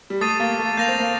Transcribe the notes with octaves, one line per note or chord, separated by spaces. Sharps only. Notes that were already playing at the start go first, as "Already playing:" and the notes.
G3
A3 D#6 A6 C7 D#7
A#3
A3
A#3 G6 A#6 F7
C4
A#3